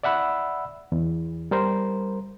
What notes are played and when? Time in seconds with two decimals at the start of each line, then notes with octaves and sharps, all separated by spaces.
0.03 D5 E5 F#5 B5 E6
0.92 E2
1.51 G3 A#4 C5